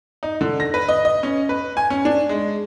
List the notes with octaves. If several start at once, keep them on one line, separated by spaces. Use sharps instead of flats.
D#4
D3
A#6
B4
D#5
D#5
C#4
B4
G#5
C#4
D4
G#3